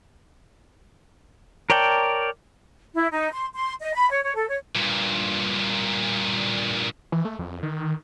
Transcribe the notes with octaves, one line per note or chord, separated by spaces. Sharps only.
A#4 C#5 D5 G5 A5
E4
D#4
C6
C6
D#5
B5
C#5
C#5
A4
C#5
G2 A#2
E3
A3
F2
D#3